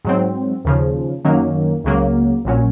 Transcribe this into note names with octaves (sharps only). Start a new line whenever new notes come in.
G#2 F#3 C4
D#2 C#3 F3
F#2 D#3 F#3 A#3 C#4
C#2 C#3 F#3 A#3
A#1 A#2 F#3 C#4